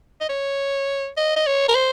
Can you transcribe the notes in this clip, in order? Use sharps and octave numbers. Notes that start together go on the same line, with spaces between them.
D#5
C#5
D#5
D#5
C#5
A#4
C5